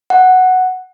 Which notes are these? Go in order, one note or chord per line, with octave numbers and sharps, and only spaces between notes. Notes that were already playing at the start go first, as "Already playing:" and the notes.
F#5